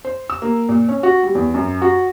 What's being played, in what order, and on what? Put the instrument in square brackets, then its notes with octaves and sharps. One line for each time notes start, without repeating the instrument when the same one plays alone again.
[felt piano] C5
E6
A#3
A#2
C#4
F#4
G3
E2
F#2
F#4